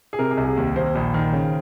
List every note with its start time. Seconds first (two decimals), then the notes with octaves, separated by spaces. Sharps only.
0.13 G#4
0.19 C3 A#4
0.31 G#4
0.37 C2
0.44 G#4
0.57 D#2
0.76 D#2 C5
0.95 A#1
1.14 D#3
1.33 C#3